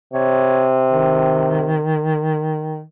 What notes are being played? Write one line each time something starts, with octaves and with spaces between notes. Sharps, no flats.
C3 C#5
D#3